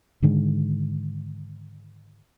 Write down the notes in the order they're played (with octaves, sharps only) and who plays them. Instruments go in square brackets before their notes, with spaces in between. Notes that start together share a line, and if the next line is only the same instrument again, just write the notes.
[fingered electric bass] G#2 D3 D#3 G#3